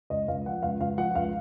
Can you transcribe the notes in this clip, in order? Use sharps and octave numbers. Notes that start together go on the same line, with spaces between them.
C#2 D#5
C#2 F5
F3 F#5
C#2 F5
C#2 F5
F3 F#5
C#2 F5